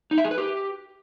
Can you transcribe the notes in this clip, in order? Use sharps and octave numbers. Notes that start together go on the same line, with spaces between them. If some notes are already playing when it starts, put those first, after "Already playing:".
D#4
E5
G#4
B4
G4